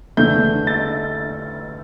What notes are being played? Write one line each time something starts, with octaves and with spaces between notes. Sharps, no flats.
E2 D3 A3 G6
A6